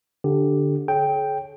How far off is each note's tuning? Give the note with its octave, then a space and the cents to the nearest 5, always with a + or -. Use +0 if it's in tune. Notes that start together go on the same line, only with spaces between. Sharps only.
D3 +0 G4 +0
G#4 +45 C#5 +0 G5 +0